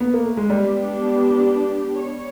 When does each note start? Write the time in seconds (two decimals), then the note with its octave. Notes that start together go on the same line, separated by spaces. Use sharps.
0.00 B3
0.14 A#3
0.25 A3
0.37 G#3
0.50 G3 B3 D4 G4
2.00 C#5